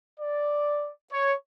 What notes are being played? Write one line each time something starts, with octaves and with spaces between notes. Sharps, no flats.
D5
C#5